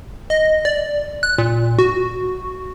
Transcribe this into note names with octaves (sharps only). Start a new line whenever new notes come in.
D#5
D5
F#6
A#2
F#4